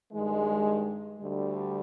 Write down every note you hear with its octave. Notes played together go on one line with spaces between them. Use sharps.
G2 D#3 G#3
D2 D3 G3